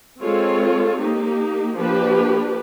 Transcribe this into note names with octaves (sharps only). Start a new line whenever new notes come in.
G#3 C4 F4 A4 C#5
A#3 D#4 G4
F3 A#3 D4 G4 B4